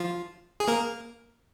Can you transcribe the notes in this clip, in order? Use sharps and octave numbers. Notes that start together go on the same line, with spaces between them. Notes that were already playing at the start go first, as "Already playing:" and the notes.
Already playing: F3 F4
G#4
A#3 A#4